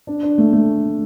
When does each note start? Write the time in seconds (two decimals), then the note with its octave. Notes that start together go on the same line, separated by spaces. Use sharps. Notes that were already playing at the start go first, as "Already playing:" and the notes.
0.07 D4
0.23 D4
0.38 A3
0.53 A3